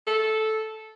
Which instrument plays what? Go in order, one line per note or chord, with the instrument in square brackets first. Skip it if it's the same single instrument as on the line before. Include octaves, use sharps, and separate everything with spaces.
[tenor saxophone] A4